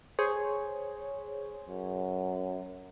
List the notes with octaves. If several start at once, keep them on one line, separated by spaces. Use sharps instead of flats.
G#4 C5 C#5
F#2